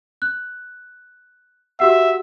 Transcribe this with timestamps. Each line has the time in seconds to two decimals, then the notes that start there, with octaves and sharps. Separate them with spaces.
0.22 F#6
1.80 F#4 G4 E5 F#5